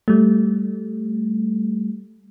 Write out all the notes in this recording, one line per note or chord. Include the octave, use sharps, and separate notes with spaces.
G3 A3